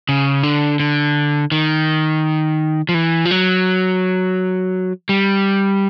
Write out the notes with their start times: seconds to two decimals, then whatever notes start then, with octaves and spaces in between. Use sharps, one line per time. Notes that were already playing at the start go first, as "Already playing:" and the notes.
0.09 C#3
0.43 D3
0.80 D3
1.52 D#3
2.89 F3
2.94 E3
3.25 F3
3.31 F#3
5.09 G3